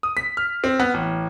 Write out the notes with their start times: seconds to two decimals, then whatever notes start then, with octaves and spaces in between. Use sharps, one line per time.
0.03 D#6
0.17 B6
0.37 F6
0.64 C4
0.80 B3
0.94 A1